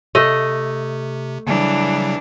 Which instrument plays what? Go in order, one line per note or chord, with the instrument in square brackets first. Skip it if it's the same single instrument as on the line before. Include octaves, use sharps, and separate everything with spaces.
[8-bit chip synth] C3 [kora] A3 D#5
[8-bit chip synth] C#3 F#3 G3 [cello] E3 D4